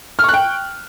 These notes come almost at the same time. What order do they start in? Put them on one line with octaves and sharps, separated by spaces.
F6 C#6 F#6 G5